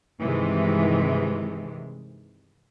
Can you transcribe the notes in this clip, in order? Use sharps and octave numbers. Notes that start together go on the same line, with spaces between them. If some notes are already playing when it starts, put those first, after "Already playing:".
G2 C3 D#3 E3 G#3